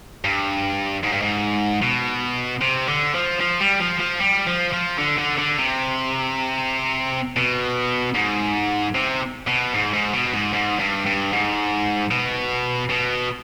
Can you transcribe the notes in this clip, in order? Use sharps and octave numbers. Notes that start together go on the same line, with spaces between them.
G2
G#2
G2
G#2
B2
C3
D3
F3
F3
G3
F3
F3
G3
F3
F3
D3
D3
D3
C3
B2
G#2
C3
B2
G#2
G#2
B2
G#2
G#2
G2
G2
G#2
B2
B2